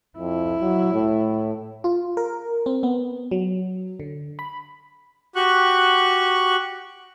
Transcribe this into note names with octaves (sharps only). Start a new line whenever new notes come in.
F2 E4
F#3
A2
F4
A#4
C4
B3
F#3
D3
B5
F#4 G4 C#6 F#6